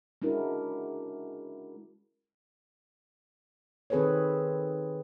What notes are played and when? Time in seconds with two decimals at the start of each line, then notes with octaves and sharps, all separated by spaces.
0.22 G#3 C#4 D4 E4 F#4 A#4
3.90 D#3 C4 G#4 A4 B4 C#5